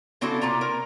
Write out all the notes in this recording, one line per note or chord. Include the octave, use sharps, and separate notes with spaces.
C#3 C4 D4 E4 F#4 A4
C3 A#3 F4 A#5
A#4